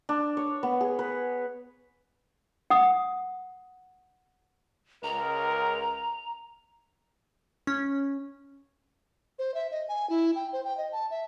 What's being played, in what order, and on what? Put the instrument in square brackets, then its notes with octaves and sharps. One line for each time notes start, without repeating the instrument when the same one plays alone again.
[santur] D4
C#5
B3
G#4
B4
[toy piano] F#5 D#6
[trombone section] C#2 A#4 [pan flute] A#5
[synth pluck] C#4
[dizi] C5
E5
D#5
G#5
E4
G5
C5
G5
D#5
A5
E5